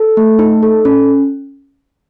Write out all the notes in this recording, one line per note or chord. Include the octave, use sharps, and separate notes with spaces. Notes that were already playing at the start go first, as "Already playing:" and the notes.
Already playing: A4
A3
D#4
A4
C#4